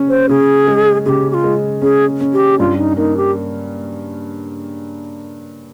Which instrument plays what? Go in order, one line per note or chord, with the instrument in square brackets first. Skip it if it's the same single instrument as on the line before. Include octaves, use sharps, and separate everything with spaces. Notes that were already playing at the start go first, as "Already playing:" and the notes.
Already playing: [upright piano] C#3 C#4
[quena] C5
[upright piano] C#3 [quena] G#4
[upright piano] G#3
[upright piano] C#3 [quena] G4 G#4
[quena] G4
F4
[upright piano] G#3
[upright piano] C#4 [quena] G#4
[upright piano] C#4
[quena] G4
[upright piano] G2 [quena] F4
[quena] D#4
[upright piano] A#3 [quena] D#4
[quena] G4